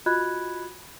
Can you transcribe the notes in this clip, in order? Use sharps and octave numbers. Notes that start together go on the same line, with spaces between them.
F4 F#4 D#5 B5 F#6 G#6